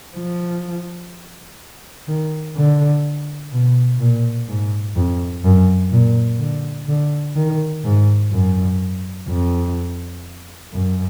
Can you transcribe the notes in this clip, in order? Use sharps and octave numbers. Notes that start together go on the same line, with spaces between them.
F3
D#3
D3
B2
A#2
G#2
F2
F#2
A#2
D3
D3
D#3
G#2
F#2
F2
F#2